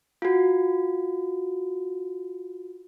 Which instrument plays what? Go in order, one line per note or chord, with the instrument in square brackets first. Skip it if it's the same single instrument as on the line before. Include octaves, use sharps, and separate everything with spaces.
[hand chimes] F4 F#4